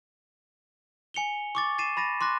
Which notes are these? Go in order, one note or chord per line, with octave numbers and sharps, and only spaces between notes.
G#5 C#7 F7 G7
C#6 D6 A6
A6 C7 D#7 E7
B5 A6 A#6 D#7
C6 D6 F#6 A#6